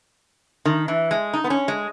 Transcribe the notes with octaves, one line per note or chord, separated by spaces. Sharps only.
D#3
E3
G#3
D#4
B3
C#4
G#3